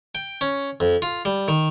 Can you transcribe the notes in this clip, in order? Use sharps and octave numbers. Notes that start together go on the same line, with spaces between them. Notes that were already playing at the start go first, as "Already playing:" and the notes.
G5
C#4
F2
F4
G3
D#3